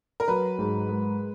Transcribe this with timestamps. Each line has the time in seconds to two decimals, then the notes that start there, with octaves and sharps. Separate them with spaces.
0.20 A#4
0.28 F#3 B4
0.59 G#2
0.89 G#3